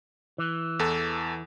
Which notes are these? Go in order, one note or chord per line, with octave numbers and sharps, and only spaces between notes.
E3
E2 A4